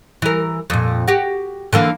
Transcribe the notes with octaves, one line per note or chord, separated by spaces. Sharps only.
E3 A#4
F2 A#2
F#4 G4
D3 E3 A#3